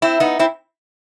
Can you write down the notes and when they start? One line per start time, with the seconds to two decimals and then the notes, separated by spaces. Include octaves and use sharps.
0.02 C4 E4
0.20 B3 D#4
0.39 C4 E4